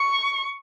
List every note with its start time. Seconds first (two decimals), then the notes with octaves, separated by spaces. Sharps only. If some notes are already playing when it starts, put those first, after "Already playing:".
Already playing: C#6